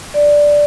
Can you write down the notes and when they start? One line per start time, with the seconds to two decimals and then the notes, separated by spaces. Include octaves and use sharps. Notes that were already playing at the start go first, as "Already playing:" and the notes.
0.14 D5